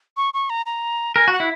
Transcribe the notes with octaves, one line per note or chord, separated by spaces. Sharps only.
C#6
C#6
A#5
A#5
A#4 G#5
F#4
F#5
E4